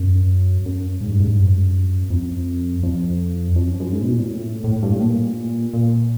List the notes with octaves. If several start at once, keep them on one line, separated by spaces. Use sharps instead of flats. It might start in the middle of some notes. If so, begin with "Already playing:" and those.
Already playing: F#2
F#2
G#2
G2
G#2
G2
F#2
F2
F2
F2
F#2
F#2
G#2
B2
A#2
A2
A2
G2
A2
A#2
A#2